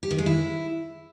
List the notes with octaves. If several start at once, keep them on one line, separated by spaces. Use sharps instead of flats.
G4
D#3
G#3
E4